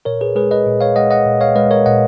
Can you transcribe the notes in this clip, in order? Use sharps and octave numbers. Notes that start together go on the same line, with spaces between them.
A#2 A#4 C#5
G#4 B4
G#3 G#4 B4
B4 D#5
A#2
C#5 F5
G#3 D#5 F#5
D#5 F#5
A#2
C#5 F5
G#3 B4 D#5
A#4 C#5
A#2 D#5 F#5